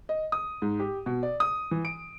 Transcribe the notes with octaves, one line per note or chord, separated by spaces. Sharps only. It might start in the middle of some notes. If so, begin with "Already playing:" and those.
D#5
D#6
G#2
G4
B2
D5
D#6
E3
D7